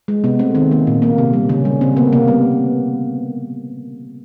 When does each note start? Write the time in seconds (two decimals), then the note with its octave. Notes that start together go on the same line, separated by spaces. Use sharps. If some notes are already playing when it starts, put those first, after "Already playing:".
0.08 G#3
0.24 C3 B3
0.39 A3 C4
0.55 D#3 C4
0.71 A#3
0.87 A#2
1.02 A#3
1.18 C3
1.33 G3
1.49 C#3 C#4
1.65 G3
1.81 C#3 C4
1.96 A#3 B3
2.13 C3 A#3
2.28 G3 B3